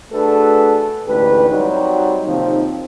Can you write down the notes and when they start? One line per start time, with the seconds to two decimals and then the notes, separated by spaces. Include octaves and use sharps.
0.12 A3 D4 F#4 G#4 A4 B4
1.06 A1 D2 G#2 G4 B4
1.50 F#3 G3 C4 D#4
2.26 D#2 C3 D#3 F3 C4 D#4